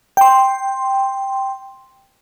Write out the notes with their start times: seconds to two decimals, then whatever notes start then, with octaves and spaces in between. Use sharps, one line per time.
0.17 G5 C6